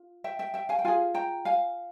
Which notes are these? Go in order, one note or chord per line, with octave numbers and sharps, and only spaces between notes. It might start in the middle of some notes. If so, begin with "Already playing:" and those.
Already playing: F4
E5 G5
E5 G5
E5 G5
F5 G#5
G5
F4 G#4 F5 G#5
G5 A#5
F5 G#5